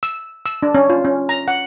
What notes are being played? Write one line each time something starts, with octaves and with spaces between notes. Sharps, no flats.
E6
E6
D4
C#4
F4
C#4
A#5
F#5